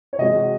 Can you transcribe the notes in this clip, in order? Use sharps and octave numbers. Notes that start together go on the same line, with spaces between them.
C#5
C3 E3 G#3 D#5
F#4